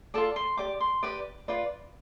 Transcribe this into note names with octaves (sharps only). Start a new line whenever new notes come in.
F4 A4 D5 A5
C6
G4 D5 D6
C6
G4 B4 D5 D6
F4 B4 D5